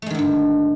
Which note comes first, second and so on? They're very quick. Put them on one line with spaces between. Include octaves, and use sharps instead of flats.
A3 G#3 D#3 D3 G2